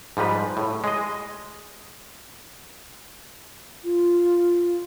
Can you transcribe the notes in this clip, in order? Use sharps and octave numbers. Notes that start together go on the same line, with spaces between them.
G#2 F3 G3 B4
A2
G#3 D#5
F4